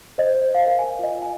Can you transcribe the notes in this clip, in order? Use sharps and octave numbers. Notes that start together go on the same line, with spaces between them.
C5 D#5
C5
C5 F5
A#4 F5
G#5
A#4
F4 D#5
F4
G#5